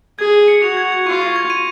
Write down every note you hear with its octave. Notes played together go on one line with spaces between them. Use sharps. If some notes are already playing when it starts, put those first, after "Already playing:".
G#4 G#6
G#6
C#7
F#4 F7
G#6
G#6
F4 C#6
C#6
G#6
D#7